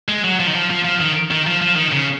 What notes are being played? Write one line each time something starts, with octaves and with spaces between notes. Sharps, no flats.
G#3
F#3
F3
D#3
F3
F3
F3
D#3
D#3
F3
F3
D#3
C#3